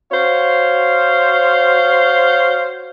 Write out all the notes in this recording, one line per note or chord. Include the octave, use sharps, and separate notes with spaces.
F#4 C5 C#5 F5